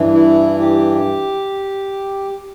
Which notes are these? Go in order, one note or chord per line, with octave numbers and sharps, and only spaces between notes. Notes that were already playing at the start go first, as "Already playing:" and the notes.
Already playing: G2 E3
E4
G4